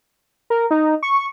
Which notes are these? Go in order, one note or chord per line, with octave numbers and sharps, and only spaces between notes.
A#4
D#4
C#6